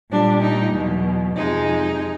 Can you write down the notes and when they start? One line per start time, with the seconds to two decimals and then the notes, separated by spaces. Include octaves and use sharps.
0.11 A#2 G3 D4
0.42 D#4
0.73 E2 B2 F#3
1.35 F2 C3 F3 G#3 D#4